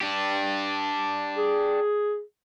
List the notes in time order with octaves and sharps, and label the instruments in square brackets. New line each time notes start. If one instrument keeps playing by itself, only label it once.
[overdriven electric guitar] D4 G4
[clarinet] G#4